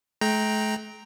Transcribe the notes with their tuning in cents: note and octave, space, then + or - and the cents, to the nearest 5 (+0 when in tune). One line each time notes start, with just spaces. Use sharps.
A3 -45 G5 +0 A#5 +0